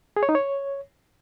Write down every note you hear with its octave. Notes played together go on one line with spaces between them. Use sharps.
G#4
C#5
D#4
C#5